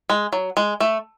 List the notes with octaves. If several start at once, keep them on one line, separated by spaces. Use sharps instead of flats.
G#3
F#3
G#3
A3